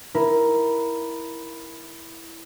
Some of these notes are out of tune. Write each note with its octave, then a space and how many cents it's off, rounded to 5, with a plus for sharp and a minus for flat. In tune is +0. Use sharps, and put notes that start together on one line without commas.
E4 +0 A#4 +10